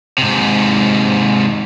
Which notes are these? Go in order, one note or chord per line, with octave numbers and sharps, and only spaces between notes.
G#2 C3